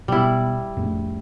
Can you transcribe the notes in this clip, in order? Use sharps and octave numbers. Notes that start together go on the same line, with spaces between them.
B2 G3 E4
F2 A2 A3